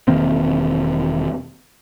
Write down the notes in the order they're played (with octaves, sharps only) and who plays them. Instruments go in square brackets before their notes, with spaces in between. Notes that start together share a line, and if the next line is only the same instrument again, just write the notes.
[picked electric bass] E1 D#3 A#3 C4